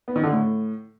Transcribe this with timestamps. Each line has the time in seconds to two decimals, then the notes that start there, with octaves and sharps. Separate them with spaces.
0.08 B3
0.16 D#3
0.24 D3
0.32 A2